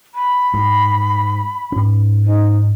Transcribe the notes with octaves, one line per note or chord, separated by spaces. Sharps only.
B5
G#2
G#2 C#4
D#4